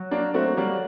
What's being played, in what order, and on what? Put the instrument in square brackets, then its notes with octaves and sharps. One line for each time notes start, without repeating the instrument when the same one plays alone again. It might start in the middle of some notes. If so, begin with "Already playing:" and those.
Already playing: [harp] F#3
[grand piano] A#3 D4 [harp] F#4
[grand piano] A3 C4 [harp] F#4
[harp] F#3 [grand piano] G3 A#3